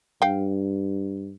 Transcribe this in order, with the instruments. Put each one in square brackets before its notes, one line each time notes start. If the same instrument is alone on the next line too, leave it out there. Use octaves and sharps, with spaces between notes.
[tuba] G2 [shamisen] F5 G5